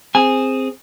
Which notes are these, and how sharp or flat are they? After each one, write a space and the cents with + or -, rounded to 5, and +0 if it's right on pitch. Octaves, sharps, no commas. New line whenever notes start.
C4 +0 G#4 -5 G#5 -5